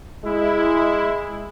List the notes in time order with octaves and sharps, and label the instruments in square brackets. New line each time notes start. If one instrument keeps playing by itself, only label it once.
[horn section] G#3 E4